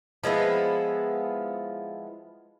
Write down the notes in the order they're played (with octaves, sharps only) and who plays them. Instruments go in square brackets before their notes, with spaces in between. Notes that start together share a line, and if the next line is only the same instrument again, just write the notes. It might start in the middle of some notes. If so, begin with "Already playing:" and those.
[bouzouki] F3 G#3 B3 E4